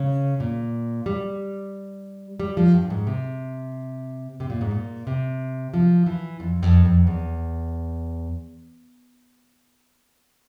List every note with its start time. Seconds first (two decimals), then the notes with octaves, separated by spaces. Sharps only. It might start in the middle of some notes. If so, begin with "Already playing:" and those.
Already playing: C#3
0.40 A#2
1.06 G3
2.40 G3
2.57 F3
2.74 G2
2.90 G#2
3.07 C3
4.40 C3
4.50 A#2
4.61 G#2
4.71 A#2
5.07 C3
5.74 F3
6.06 E3
6.40 F2
6.63 F2
6.85 F2
7.07 E2